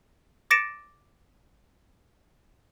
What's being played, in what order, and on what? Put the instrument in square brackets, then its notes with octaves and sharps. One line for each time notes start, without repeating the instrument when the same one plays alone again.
[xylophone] D6 A6 A#6 C#7 D7 E7